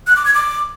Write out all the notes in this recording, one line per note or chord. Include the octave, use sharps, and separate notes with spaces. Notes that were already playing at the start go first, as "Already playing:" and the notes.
F#6
D6
G#6
D6